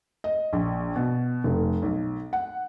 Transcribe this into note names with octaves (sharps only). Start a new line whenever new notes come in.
D#5
A#1
B2
F1
B1
F#5